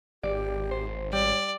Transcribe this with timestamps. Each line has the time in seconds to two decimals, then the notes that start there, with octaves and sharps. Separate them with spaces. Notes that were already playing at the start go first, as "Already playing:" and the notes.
0.23 G#1 G4 D5
0.71 C5
1.13 G3 C#5 D5